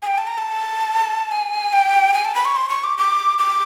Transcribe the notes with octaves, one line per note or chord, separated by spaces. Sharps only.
G#5
G5
A5
A#5
A5
G#5
G5
G#5
A5
B5
C#6
C6
C#6
D6
D6
D6